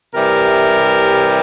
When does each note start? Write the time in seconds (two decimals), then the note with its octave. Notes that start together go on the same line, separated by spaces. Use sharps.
0.15 C3 E3 G3 A#4